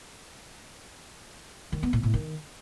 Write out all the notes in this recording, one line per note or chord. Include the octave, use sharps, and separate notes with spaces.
D#3
B3
A2
A2
D#3